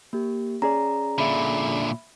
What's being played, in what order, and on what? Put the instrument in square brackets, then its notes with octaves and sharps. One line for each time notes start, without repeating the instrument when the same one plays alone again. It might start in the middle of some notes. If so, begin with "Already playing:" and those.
[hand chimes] A#3 G4
[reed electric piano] C#4 G#4 D5 [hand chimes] A#5
[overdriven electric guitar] A#2 D3 [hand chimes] E5 B5